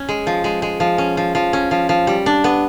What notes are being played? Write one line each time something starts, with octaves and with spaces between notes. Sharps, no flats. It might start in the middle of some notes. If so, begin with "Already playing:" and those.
Already playing: C#4
G#3
F3
G#3
G#3
F3
C#4
F3
F3
C#4
F3
F3
G3
D4
B3